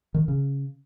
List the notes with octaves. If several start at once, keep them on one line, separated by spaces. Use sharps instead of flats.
D#3
C#3